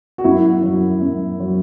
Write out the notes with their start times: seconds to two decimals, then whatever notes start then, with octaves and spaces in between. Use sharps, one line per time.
0.18 F#4
0.24 F#2 E4
0.63 F#3
1.02 F#2
1.40 F#3